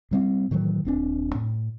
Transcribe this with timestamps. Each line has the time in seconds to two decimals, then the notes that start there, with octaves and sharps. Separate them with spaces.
0.11 A#2 G3 C4
0.51 A2 D#3 E3 F#3
0.85 D#1 C4 D4
1.35 A2